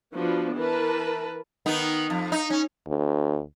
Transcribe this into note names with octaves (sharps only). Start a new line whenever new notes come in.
F3 B3 D4 F#4 B4
E3 A#4 B4 A5
D#3 B3 D#4
F2
D#4
C#4
D2